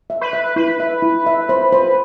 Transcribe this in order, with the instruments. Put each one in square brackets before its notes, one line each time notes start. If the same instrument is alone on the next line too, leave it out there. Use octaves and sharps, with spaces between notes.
[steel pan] E5
[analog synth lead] B4
[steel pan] E5
[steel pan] E4 [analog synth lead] B4
[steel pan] E5
E4
E5
C5
C5